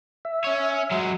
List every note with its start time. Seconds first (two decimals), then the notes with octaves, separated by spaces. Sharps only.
0.25 E5
0.44 C#4 C#5
0.92 F#3 G#3